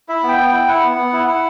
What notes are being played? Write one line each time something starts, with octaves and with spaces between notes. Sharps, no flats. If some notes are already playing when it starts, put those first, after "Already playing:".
E4 E5
B3
G5
B3
E4 G5
E4 F#5
B3
B3
E4
E4 F#5